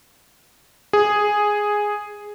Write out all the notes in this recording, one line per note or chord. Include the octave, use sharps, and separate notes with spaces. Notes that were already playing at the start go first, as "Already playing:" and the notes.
G#4